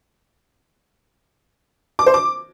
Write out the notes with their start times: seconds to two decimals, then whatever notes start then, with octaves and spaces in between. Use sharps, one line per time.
1.99 D6
2.06 C5
2.14 D6